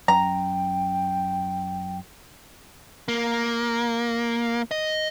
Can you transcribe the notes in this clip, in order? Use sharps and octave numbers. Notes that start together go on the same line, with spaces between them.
F#2 G5 A#5
A#3
D#5